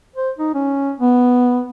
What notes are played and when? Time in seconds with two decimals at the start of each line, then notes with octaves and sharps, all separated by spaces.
0.16 C5
0.38 D#4
0.54 C#4
1.00 B3